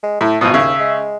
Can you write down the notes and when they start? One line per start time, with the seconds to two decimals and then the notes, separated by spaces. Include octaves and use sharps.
0.03 G#3
0.21 A2 A3
0.41 G#1 B2 F3 D#6
0.54 D#2 C#3 E5
0.79 G#3